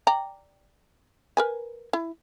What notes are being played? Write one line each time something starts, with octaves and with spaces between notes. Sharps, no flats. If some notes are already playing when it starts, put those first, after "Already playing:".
D5 G5 A#5
A#4 B4 G#5
E4